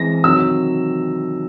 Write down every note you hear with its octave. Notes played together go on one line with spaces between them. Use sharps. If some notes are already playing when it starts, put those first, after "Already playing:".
Already playing: E3 G#3 C4 A#6
C3 D#3 F#3 E6